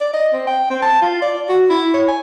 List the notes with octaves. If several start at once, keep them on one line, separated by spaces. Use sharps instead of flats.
D5
D#5
C4
G5
C4
A5
F4
D5
F#4
E4
C#5
G#5